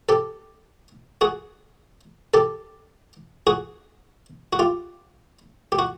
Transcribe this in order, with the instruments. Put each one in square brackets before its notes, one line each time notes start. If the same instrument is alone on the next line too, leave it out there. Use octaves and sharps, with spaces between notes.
[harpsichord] G4 A4
F#4 G#4
G4 A4
F#4 G#4
F#4
F4 G4
G4
F#4